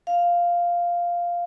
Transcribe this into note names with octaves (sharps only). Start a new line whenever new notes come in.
F5